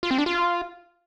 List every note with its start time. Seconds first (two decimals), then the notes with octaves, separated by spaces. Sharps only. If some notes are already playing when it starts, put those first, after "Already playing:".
0.03 F4
0.11 C4
0.18 D4
0.26 F4